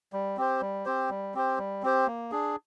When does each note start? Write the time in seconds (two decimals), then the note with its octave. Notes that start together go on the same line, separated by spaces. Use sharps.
0.13 G3
0.37 C4 G4 C5
0.61 G3
0.85 C4 G4 C5
1.10 G3
1.34 C4 G4 C5
1.58 G3
1.83 C4 G4 C5
2.07 A#3
2.32 D4 G#4